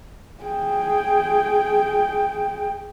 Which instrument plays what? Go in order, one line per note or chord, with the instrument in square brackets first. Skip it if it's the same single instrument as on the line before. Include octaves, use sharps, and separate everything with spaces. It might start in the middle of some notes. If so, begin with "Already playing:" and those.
[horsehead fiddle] G#4 G5